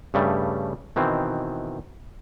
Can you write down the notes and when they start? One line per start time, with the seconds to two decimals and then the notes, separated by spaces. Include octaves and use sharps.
0.14 G2 C#3 G3 A3
0.96 B2 D#3 E3 C4